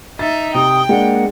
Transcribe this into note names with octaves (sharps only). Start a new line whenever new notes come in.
D#4 E5 A6
C3 G5 D#6
G#3 A#3 D4 F#5